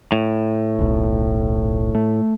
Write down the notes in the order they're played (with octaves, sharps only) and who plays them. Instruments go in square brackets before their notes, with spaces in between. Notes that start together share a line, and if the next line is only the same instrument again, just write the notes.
[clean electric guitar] A2
[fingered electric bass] D#1 B1
A3